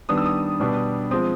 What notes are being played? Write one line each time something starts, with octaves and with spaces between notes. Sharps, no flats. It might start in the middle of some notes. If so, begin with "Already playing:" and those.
D#3 G3 B3 D4 D#6
E6
D#6
B2 G3 B3 D4
F3 G#3 C4 D#6